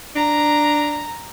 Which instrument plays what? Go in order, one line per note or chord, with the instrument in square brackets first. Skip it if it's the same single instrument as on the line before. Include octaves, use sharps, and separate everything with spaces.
[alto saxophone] D4 [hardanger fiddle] A#5